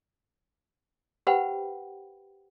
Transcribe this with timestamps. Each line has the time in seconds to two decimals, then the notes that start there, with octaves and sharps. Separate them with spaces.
1.27 G4 B4 C5 F#5 G5 B5